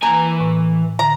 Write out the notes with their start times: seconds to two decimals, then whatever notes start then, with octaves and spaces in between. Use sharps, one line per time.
0.02 E3 A#3 G#5 A#5
0.40 A2
0.99 D3 A#5